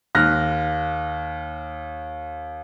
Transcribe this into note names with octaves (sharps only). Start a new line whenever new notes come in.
D#2 F6 F#6 A#6